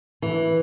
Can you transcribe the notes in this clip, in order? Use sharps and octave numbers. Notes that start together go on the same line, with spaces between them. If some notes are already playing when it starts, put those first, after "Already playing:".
E3